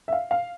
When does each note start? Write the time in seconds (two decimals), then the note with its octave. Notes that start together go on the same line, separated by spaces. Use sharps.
0.08 E5
0.13 F5
0.31 F5